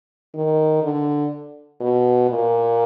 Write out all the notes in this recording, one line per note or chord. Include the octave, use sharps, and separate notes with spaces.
D#3
D3
B2
A#2